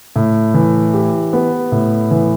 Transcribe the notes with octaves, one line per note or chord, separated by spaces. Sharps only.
A2
E3
G4
B3
A2
E3